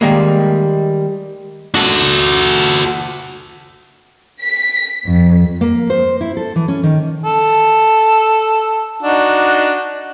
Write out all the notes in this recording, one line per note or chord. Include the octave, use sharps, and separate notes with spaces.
D#3 G3 G#3 A#3
F#4 A4
B6
F2
A#3
C5
E4
A4
E3
C#4
D#3
A4
D4 D#4 F#4